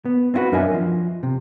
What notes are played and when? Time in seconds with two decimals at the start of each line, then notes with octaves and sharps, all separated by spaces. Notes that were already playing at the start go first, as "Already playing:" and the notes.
0.05 B3
0.34 C4 C#4 E4 F#4 B4
0.52 F#2 D4 A#4 D#5 E5 G#5
0.74 F3
1.23 C3